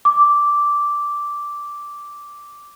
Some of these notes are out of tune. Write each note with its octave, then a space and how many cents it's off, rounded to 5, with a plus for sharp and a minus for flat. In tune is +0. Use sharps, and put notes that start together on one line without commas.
D6 -5